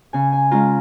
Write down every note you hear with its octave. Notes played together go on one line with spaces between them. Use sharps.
C#3 G#5
G#5
G#3 C#4 F4 A#5